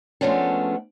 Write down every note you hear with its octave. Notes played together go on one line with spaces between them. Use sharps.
F3 G#3 A3 B3 C#4 D4